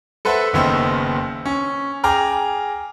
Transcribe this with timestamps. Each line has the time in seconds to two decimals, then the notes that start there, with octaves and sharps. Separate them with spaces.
0.25 A4 B4 C5 E5 F#5
0.53 F#1 D#2 D#3 B3 C5 E6
1.46 C#4
2.04 G#4 G5 A#5 D6 F6